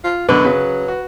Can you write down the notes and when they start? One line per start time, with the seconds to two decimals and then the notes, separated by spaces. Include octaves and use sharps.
0.04 F4
0.29 F#2 B2 D3 D4 B4
0.45 C#3 F#3
0.88 F#4